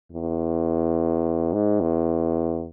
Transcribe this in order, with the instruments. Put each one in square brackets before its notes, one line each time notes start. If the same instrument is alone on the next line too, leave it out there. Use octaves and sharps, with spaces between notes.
[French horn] E2
G#2
E2